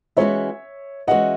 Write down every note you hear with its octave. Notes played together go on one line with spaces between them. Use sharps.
E3 G#3 C#4 F#4 C#5 E5
E3 G#3 C#4 F#4 D#5 F#5